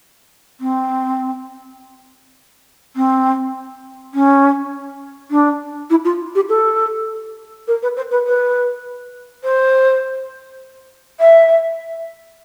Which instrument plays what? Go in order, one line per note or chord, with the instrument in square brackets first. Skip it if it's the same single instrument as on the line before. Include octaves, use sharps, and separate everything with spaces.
[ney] C4
C4
C#4
D4
E4
F4
G4
A4
A#4
B4
C5
B4
B4
C5
E5